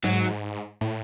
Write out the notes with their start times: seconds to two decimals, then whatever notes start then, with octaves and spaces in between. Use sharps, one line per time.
0.04 G#2 F#3
0.81 A2